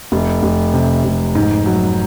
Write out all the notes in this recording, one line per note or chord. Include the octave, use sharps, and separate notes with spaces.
F1
F1
C3
F1
G#2
F#3